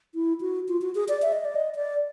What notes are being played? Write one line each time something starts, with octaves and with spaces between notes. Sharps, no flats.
E4
F#4
F4
F#4
G#4
D5
E5
D#5
D5
D#5
D5